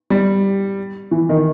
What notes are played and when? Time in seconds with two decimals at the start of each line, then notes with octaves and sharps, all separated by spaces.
0.10 G3
1.11 E3
1.29 D#3